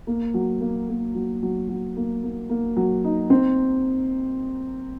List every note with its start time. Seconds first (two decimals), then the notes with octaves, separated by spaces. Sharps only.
0.07 A#3
0.34 F#3
0.61 A#3
0.89 A#3
1.15 F#3
1.43 F#3
1.69 F#3
1.97 A#3
2.23 A#3
2.49 A#3
2.76 F#3
3.04 D#4
3.30 C4